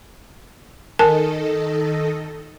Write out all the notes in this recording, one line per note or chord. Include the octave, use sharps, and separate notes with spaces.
D#3 A4 A#4 D#5 G#5 A5